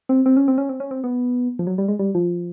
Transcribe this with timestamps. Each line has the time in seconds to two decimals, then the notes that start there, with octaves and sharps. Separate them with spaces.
0.09 C4
0.26 C4
0.37 C#4
0.48 C4
0.58 C#4
0.69 C4
0.80 C#4
0.91 C4
1.04 B3
1.59 F3
1.67 F#3
1.78 G3
1.88 G#3
1.99 G3
2.15 F3